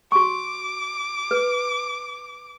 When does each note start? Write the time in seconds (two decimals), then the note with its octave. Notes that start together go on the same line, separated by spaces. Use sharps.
0.12 F#4 C#6 D6
1.31 B4